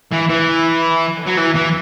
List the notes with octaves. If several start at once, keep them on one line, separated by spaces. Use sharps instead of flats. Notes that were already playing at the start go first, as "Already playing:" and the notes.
E3
E3
F#3
E3
E3